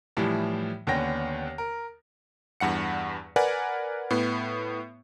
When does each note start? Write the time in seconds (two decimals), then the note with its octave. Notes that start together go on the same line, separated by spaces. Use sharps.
0.17 A2 E3 F3 G3
0.87 D#2 D3 B3 C#4 G5 A#6
1.58 A#4
2.60 E2 G2 F#5 C#7
3.36 A#4 B4 D5 F#5 G#5
4.10 A2 B3